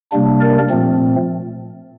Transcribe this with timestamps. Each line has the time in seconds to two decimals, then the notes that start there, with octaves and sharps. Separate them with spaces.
0.12 C3 G3 A#3 D4
0.41 A#4 D5
0.70 A#2 F3 A3 C4